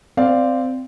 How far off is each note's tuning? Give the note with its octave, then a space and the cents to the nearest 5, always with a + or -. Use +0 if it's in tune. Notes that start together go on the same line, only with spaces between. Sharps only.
C4 -10 D5 +0 F5 +0